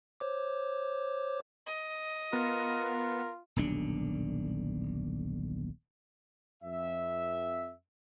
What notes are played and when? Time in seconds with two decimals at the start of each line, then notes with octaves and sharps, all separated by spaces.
0.20 C5 C#5 D6
1.67 D#5
2.33 B3 F4 A#4
3.56 D#1 B1 D3 D4
6.63 F2 E5